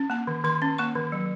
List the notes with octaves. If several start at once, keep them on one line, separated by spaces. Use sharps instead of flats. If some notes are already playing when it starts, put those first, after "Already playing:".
Already playing: C#4
A#3 A5
D#3
D#3 C6
C#4
A#3 C#6
D#3
F#3